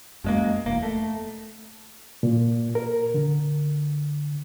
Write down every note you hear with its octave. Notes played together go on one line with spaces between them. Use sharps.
F#2 G#3 A#3
E1 A#3
A3
A#2
A#4
D3